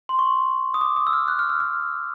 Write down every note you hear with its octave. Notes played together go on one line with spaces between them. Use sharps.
C6
C#6
D#6
D6
D#6
E6
F6
F#6
F6
E6
F6